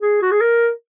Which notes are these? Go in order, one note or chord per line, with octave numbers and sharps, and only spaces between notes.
G#4
F#4
G#4
A#4